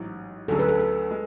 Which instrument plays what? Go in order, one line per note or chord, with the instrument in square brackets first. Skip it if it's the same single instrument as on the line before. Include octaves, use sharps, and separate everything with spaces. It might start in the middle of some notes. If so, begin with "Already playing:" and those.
Already playing: [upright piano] A1 G#2 F#3
[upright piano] D2 D3 F#3 C#4 G#4 [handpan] A4
[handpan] B4
A4
A4
[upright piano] G#3